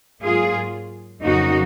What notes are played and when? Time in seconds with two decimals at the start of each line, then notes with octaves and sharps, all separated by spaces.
0.23 G#2 F#3 A#3 F4 G#4
1.22 F2 C#3 F#3 A#3 D#4 F#4